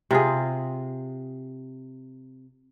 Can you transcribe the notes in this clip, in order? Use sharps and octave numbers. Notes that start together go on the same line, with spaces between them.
C3 F4 G#4